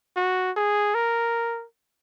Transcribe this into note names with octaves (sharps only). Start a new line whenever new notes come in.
F#4
G#4
A#4